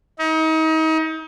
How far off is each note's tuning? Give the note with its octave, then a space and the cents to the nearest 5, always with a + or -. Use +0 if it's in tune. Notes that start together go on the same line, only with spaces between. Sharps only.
D#4 +35